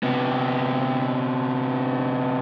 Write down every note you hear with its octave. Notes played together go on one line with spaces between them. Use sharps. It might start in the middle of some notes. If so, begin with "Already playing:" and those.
C3 B3